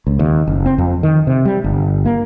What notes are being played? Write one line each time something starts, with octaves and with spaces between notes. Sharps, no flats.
C#2
D#2
F#1
C4
F2
D#3
C3
G3
G1
A#3